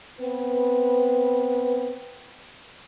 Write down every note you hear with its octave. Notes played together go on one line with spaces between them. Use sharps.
B3 C4 B4